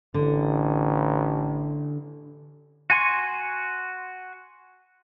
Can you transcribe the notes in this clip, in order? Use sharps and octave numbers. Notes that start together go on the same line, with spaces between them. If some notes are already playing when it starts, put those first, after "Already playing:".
A1 D3
F#4 G#5 C6 C#6